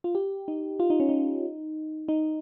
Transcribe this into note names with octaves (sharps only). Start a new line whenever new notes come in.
F4
G4
D#4
F4
D#4
C#4
D#4
D#4